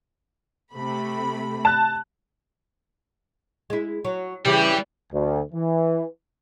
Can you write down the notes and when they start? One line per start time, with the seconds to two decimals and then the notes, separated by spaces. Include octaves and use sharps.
0.73 C3 A3 B5
1.65 A5 F#6
3.70 G#3 E4
4.05 F#3
4.46 C#3 E3 G3 G4
5.12 D2
5.53 E3